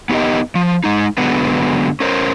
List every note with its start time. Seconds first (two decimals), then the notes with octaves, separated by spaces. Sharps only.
0.10 B3 D#4 G4 A#4 D#5
0.55 F3
0.84 G#3 D#4
1.18 D3 F#3 G#3 B3 B4
2.00 C#4 A#4 C5 C#5